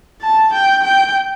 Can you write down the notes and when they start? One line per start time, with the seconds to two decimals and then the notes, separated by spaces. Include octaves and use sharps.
0.22 A5
0.54 G5
0.84 G5